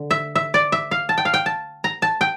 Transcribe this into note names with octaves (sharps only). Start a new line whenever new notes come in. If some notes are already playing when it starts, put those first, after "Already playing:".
Already playing: D3
E5
E5
D5
E5
F5
A5
G5
F5
G5
A5
A#5
A5
G5